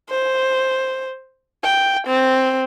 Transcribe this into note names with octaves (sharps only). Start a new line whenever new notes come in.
C5
G5
C4